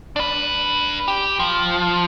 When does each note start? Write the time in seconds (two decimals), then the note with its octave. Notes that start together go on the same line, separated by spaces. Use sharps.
0.16 D4 B4
1.08 G4
1.39 F3